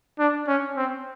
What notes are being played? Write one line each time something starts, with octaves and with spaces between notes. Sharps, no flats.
D4
C#4
C4